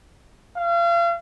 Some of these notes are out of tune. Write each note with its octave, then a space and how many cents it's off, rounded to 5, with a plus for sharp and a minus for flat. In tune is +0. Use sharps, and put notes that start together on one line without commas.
F5 -35